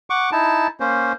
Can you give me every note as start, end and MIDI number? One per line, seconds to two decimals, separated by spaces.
0.10 0.30 78
0.10 0.30 85
0.10 0.30 86
0.32 0.67 63
0.32 0.67 64
0.32 0.67 81
0.80 1.13 58
0.80 1.13 61
0.80 1.13 72